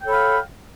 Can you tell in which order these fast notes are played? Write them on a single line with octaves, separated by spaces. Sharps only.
G5 A4 C#5 B5 F5